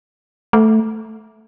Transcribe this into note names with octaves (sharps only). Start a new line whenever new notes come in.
A3